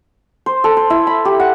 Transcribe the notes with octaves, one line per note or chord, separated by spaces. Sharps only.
C5
A4
C5
E4
B5
G4
F#5